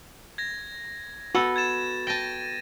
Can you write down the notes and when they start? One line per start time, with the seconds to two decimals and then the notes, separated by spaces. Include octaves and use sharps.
0.38 G#6 A#6
1.35 B3 F#4 A4
1.56 G#6 A6 E7
2.07 G5 A5 A6 A#6 D#7